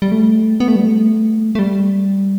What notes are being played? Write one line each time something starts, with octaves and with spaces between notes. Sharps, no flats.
G3
A3
B3
A3
G3
A3
A3
G3